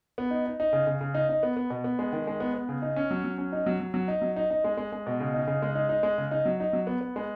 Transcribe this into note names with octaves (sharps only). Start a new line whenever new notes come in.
B3
D#4
D#4
D#4
C#3
C#3
C#3
D#4
D#4
B3
B3
B2
B3
G#3
D#3
G#3
B3
B3
C#3
D#4
C#4
F#3
F#3
C#4
D#4
F#3
F#3
F#3
D#4
F#3
D#4
D#4
G#3
G#3
G#3
B2
C#3
D#4
C#3
G#3
D#4
D#4
G#3
C#3
D#4
F#3
D#4
F#3
B3
B3
G#3